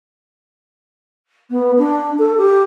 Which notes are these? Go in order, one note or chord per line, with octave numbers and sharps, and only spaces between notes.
B3
D4
A4
G4